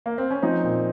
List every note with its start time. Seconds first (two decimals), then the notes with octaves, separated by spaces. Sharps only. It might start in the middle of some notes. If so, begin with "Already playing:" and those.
0.06 A#3
0.18 C4
0.31 C#4
0.42 F3 C4 D#4
0.64 A#2